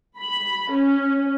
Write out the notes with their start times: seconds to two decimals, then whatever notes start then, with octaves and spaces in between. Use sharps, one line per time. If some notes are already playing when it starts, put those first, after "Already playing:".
0.18 B5
0.72 C#4